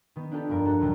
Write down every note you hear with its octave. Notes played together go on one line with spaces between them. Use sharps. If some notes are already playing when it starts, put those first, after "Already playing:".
D#3 B3
D4 D#4 F4 G4 A4
F1 G2 G3 A#4
F#4 A4
D#2 A#2 F#3 G3